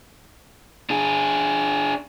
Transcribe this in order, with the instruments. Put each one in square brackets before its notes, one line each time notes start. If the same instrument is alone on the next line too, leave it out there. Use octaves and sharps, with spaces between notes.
[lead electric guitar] D4 G#4